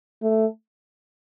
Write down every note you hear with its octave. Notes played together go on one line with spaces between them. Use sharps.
A3